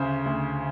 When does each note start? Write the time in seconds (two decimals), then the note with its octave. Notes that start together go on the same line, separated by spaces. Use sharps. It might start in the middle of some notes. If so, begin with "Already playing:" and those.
Already playing: D2 C#3 C5
0.26 D2